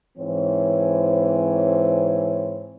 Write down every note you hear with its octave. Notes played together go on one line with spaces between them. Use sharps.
G#2 E3 C4 C#5